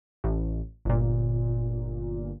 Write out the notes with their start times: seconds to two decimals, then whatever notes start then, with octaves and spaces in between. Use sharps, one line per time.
0.24 A1
0.85 G1 A#2